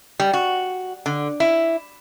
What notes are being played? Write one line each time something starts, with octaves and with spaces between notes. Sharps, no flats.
G3
F#4
D3
E4